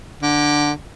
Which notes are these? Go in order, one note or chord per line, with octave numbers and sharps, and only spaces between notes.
D3